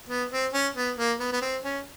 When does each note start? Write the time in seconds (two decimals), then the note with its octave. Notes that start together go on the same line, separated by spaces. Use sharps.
0.09 B3
0.31 C4
0.53 C#4
0.75 B3
0.97 A#3
1.20 B3
1.32 B3
1.42 C4
1.64 C#4